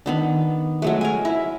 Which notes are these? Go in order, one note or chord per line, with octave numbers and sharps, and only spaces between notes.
D#3 B3 D4
F#3 G#3 A3
A#4 G#5
E4